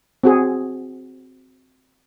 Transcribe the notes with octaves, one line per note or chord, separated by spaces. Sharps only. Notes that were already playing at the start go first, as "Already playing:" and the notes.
C4 F#4 G#4